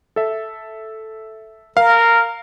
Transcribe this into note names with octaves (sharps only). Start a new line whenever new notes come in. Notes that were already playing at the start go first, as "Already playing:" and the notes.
A4 E5
A#4 F5